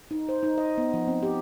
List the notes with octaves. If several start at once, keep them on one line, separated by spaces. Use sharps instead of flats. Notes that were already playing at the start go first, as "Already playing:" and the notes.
D#4
C5
D#4
D#5
B3
F3
C4
G4